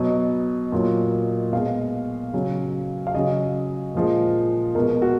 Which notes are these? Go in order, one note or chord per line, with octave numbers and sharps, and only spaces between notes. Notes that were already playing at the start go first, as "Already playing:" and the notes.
Already playing: B2 F#3 D#5
A#2 F#3
B2 G#3 F5
C#3 F#3
F5
C#3 F#3 D#5
A#2 F3 G#3
B2 G#3 A#4
F#4